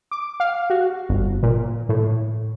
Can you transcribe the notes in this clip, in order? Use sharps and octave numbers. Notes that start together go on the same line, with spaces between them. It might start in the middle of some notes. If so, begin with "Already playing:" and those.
D6
F5
F#4
G1
A#2
A2